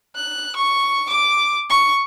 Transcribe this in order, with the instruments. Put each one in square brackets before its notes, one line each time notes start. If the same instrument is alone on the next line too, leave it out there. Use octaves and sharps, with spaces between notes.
[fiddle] F#6
C#6
D6
C#6